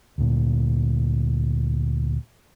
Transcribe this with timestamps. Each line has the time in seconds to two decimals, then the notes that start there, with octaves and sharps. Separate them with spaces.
0.18 D2 A#2